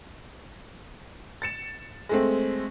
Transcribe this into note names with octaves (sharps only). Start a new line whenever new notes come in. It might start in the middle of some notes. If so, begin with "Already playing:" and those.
A6 C#7 E7
G#3 A3 C4